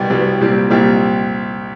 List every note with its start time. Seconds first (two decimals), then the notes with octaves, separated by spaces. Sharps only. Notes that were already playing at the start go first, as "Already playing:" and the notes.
Already playing: C2 B2 G3 B3 F#4
0.10 C2 B2 G3 B3
0.41 C2 A#2 G3 C4
0.70 C2 A#2 G3 C4